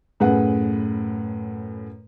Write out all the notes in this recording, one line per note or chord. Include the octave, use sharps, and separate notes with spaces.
F#2 A2 G#4 B4 F#5